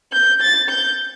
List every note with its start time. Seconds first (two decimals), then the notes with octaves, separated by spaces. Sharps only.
0.12 G6
0.42 A6
0.70 G6